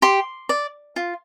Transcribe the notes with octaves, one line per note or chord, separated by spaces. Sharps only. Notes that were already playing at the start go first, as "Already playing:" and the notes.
G4 C6
D5
F4